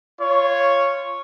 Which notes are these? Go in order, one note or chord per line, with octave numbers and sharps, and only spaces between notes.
F4 C#5